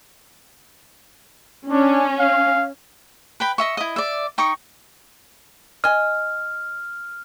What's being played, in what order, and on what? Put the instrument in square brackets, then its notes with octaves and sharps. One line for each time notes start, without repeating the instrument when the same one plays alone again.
[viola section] C#4 [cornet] D4
[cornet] F5
[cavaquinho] B4 G5 B5
D#5 E5 C#6
E4 D#5
D5 E5
D#4 G5 C#6 D#6
[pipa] D#5 G#5 [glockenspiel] F6